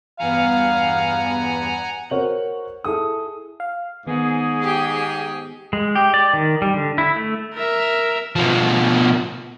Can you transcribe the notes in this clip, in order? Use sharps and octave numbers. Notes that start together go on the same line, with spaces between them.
E2 G2 B3 F5 F#5 G#5 A#5
F#4 A#4 C5 C#5 F#5 F#7
E4 G#4 A4 D#6
F5
G#2 D#3 B3 G#4
G4 G5
G#3
G4
D5
D#3
G3
D3
E4
A3
A#4 E5
B2 F3